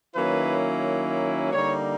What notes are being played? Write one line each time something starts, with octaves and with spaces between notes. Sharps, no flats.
D#3 F#3 A#3 C#4 E4 B4
D3 G3 A#3 D#4 C#5